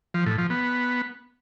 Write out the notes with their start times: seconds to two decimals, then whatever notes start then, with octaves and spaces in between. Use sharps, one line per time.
0.14 F3
0.26 A2
0.38 F3
0.50 B3